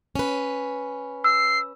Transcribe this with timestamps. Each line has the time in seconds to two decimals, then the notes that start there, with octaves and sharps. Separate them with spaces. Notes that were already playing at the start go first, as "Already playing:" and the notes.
0.15 C#4 B4
1.24 E6 C7